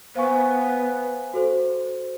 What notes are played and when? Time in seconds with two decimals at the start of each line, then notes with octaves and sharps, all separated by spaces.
0.15 B3 C5 F5 G#5 C#6
1.34 F#4 A4 C5